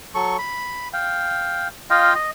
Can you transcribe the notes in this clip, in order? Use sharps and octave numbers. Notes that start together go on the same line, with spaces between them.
F#3 A4 C#6
B5
F5 G5
F4 D#5 F5 G5
D#5